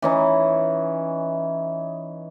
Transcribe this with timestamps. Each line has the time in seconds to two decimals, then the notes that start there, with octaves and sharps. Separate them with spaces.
0.02 E3 C#4 D#4